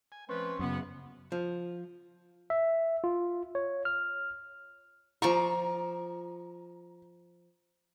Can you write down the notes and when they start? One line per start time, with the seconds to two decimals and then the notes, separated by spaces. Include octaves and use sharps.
0.12 G#5
0.29 F3 A3 C4 C#4 B4
0.59 F#2 C#3 B3
1.32 F3
2.50 E5
3.04 F4
3.55 C#5
3.85 F6
5.22 F3 D5 A#5 C#6